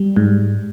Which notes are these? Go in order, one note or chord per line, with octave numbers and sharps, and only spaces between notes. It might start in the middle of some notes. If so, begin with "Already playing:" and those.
Already playing: G3
G#2